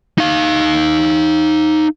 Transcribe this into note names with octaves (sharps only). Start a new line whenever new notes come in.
D#4 F5